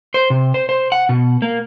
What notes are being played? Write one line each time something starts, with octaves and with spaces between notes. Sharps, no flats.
C5
C3
C5
C5
F#5
B2
A#3